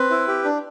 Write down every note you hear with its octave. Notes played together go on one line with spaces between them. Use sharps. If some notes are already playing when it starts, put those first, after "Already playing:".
Already playing: C4 B4
E4
G4
D4